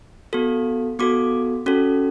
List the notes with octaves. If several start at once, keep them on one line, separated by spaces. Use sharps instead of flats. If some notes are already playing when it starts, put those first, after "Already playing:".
B3 F#4 A4
B3 F#4 A4 D6
C#4 F#4 A4